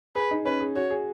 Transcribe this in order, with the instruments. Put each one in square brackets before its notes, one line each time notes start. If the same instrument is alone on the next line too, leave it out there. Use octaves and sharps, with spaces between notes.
[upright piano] G#4 [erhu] B4
[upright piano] D#4
[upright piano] C#4 [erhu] B4
[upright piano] G#4
[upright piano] F#4 [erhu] C#5
[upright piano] G#4